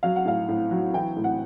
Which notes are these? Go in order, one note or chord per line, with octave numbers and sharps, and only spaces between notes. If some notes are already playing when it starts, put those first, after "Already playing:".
F#3 F5
F#5
A2 F5
A2
F#3
E3 G5
A2
F#5